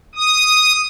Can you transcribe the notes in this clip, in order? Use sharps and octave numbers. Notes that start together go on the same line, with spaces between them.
D#6